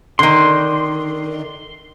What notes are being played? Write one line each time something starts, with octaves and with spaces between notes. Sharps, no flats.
D3 D#3 C6